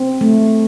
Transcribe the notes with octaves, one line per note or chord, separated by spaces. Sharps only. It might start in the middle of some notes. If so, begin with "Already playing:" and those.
Already playing: C4
A3